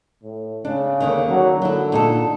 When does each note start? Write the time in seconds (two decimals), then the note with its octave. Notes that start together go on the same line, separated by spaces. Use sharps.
0.24 A2
0.65 C#3 D4
1.00 D#2 D3 D#3
1.30 F#3
1.62 D3 F#3 E4
1.92 A#2 D#4 A4